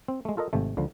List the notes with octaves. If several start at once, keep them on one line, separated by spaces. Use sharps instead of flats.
C4
G#3 A3
F4 A4 A#4 D#5
G#1 C3 A3
C#2 D3 F3